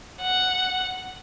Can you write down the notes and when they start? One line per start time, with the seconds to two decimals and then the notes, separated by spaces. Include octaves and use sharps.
0.22 F#5